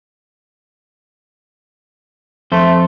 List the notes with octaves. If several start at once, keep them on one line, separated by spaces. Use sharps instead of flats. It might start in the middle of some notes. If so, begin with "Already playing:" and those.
F2 A3 C5